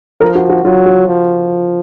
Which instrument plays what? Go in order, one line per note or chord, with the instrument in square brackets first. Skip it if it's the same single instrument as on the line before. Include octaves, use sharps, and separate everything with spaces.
[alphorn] F3 [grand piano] A#4
[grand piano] F#4
F#4
[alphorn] F#3 [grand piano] F4
[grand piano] F#4
[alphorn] F3